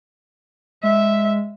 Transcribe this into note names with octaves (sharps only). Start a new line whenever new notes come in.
G#3 E5